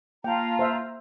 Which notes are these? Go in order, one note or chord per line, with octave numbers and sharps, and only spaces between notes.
A#3 F4 G5 A5 A#5
C5 E5